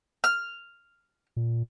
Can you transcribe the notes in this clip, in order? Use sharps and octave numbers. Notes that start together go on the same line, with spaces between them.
F6
A#2